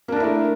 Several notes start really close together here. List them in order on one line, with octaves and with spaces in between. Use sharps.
A#3 D4 A#4 E4 A3